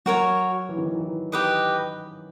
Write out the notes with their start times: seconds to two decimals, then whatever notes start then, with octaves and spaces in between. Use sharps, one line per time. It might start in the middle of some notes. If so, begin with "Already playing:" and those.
0.06 F#3 F#4 A#4 C#5
0.69 E3
0.78 D#3
0.86 E3
1.00 E3
1.32 G4 B4 D#5